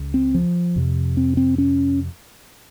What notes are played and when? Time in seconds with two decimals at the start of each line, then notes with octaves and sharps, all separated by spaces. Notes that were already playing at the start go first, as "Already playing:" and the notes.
Already playing: C#2 C#3
0.14 C4
0.35 F3
0.76 F2 C3
1.17 C4
1.37 C4
1.58 C#4